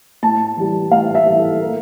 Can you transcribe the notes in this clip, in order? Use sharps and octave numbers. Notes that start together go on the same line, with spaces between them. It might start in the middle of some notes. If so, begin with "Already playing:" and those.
A2 A5
E3 G3
A2 F5
E5
E3 G3
A4
A#2 A#4